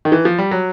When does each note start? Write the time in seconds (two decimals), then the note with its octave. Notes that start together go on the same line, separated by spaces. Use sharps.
0.05 D#3
0.12 E3
0.25 F3
0.38 G3
0.51 F#3